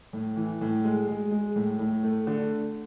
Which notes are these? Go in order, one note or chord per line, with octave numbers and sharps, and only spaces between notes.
A2
E3
A2
G#3
G#3
G#3
A2
A2
A3
D3